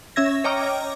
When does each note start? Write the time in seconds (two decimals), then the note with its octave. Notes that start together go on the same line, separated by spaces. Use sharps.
0.16 C#4 E5 E6 G#6 A#6
0.44 C#5 D#5 G5 A#5 D6 F6